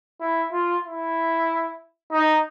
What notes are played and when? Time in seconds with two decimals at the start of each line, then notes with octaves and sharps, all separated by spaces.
0.21 E4
0.52 F4
0.85 E4
2.11 D#4